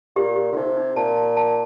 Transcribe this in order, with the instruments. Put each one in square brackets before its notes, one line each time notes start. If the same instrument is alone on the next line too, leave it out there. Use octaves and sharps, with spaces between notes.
[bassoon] A#2 [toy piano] G4
[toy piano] G4
[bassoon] D3
[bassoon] C3 [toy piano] D#4
[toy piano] D#4
[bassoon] A#2 [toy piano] A5
[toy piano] A5
A5